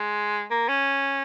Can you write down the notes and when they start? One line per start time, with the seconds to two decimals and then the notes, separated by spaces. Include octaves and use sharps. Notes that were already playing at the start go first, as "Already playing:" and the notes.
Already playing: G#3
0.51 A#3
0.69 C#4